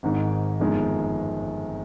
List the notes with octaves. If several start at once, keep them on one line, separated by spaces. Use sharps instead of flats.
G#1 G#2 D#3
G1 F2 D#3 G#3